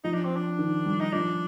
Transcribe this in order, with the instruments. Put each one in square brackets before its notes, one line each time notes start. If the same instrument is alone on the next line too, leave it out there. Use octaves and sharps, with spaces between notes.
[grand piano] F3 [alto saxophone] D#4
[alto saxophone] D4
C4
D4
[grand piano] D#3
G3
[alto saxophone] D#4
[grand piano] F3 [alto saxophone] D4